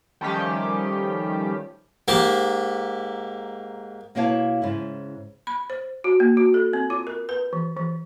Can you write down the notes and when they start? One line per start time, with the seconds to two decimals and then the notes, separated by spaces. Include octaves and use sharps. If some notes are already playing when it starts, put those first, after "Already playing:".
0.21 D#3 F3 G3 A3 C#4 G4
2.08 G#2 A#3 G4
4.15 B2 A#3 E4 C#5 F5 A5
4.62 G#2 C#3 E4
5.47 B5
5.70 C5
6.04 F#4
6.20 A#3
6.37 F#4
6.54 A4
6.73 C4
6.90 F4
7.07 A#4
7.29 B4
7.53 E3
7.77 E3